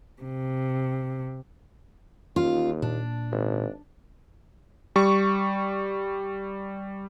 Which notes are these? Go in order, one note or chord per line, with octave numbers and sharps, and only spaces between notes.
C3
D#2 C#4 F4
A#2 D4
G#1
G3 C#6